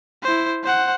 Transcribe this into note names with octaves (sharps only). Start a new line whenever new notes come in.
E4 C5
C5 F#5